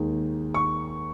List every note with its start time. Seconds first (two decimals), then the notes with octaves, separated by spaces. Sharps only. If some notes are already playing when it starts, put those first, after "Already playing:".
Already playing: D#2 D#3 G#3
0.54 C#6